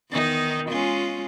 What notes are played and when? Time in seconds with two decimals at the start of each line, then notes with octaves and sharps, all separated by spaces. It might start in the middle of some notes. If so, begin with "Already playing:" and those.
0.10 E2 D#3 D#4
0.69 G#3 C#4 F4